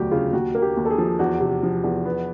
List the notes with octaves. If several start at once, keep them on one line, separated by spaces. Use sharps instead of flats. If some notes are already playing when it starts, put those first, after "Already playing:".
Already playing: E1 D2 F#3 F#4 G4
C#3 F4
D#2 F#4
A#3
G4
D#2
A4
G#4
F3
E2 F#4
C3
F3
E2
B3